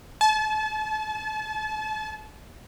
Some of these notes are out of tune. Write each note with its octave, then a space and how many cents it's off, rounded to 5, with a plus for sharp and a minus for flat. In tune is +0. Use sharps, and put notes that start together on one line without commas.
A5 -35